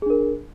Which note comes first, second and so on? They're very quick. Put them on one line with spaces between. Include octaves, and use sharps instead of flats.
G#4 D4 A#4